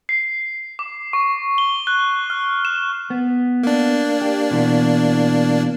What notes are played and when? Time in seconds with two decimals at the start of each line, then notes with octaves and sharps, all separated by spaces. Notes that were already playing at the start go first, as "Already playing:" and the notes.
0.09 C7
0.79 D6
1.13 C#6
1.58 G7
1.87 F#6
2.30 F6
2.65 E7
3.10 B3
3.63 A#3 D4
4.21 G4
4.51 B2 E3